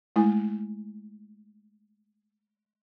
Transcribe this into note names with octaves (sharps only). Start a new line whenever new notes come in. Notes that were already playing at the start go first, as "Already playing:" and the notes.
G#3 A3 E4 G#5